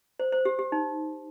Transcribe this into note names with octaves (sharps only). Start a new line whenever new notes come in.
C5
C5
G4
G4
D#4